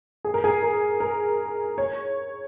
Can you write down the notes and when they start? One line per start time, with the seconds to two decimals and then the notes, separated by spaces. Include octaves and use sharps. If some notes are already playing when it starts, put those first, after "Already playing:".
0.25 G#4
0.34 A#4
0.44 G#4
0.62 A#4
1.00 A#4
1.78 C#5